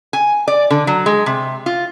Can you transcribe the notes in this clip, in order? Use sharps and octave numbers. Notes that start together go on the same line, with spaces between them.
G#5
D5
D3
F#3
G#3
C3
F4